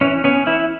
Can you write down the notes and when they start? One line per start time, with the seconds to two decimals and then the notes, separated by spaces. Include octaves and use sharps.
0.01 E3 C#4
0.24 B3 C#4
0.46 E3 E4